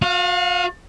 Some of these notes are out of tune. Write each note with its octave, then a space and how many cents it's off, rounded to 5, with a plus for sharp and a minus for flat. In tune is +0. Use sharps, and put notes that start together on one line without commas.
F#4 -45 F5 +0